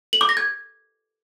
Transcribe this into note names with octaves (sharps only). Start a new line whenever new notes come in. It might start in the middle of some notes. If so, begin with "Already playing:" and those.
F#7
D6
A#6
G#6